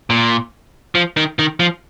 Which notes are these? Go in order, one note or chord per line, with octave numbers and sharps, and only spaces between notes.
A#2
F3
D#3
D#3
F3